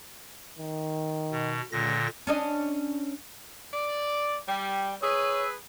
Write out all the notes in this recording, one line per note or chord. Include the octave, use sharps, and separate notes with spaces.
D#3
B2
C#2 A#2 D3 A#6
C#4 D4 D#5
D5
G3 G5
G#4 B4 C#5 E6